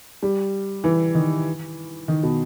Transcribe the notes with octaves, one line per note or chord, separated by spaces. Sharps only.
G3
E3
D#3
D#3
B2